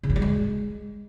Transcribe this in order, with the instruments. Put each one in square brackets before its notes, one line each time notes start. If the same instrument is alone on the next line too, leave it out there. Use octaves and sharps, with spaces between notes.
[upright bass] C#3
G2
G3
G#3